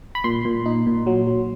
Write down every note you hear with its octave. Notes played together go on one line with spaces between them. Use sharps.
B5
A#2 C6
A#2
D#4
A#2
F#3
F#3